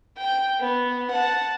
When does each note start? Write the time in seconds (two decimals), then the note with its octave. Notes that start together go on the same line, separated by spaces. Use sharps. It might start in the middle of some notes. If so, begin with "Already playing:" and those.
0.18 G5
0.61 B3
1.12 F#5 A5